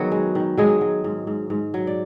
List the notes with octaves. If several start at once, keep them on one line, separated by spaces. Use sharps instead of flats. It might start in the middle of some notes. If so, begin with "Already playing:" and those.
Already playing: D#3 F#3 B3 F#4 G#4
G#3
D#3
F#3 G#3 G#4
F#3
G#2
G#2
G#2
F#3
D5